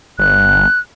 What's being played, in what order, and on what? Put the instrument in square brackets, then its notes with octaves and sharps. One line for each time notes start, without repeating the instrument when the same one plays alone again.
[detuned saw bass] G1 [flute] F#6